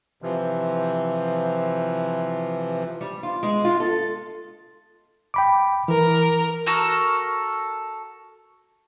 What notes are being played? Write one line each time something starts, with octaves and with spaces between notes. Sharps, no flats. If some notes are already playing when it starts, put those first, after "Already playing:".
C3 E3 F3
G3
F4
G#3
F4
A4
G5 B5 D6
E3 A#4
F#4 A4 A#4